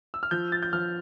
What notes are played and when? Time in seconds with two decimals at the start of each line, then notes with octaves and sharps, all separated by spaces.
0.14 E6
0.23 F6
0.31 F3 G6
0.52 A6
0.63 G6
0.73 F3 F6